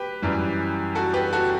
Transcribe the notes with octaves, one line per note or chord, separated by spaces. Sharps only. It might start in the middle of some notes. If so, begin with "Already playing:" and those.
Already playing: G4 B4
F#2 E3 G3
F#4 A4
G4 B4
F#4 A4